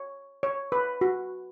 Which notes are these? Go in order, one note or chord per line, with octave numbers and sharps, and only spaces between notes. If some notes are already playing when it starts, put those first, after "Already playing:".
Already playing: C#5
C#5
B4
F#4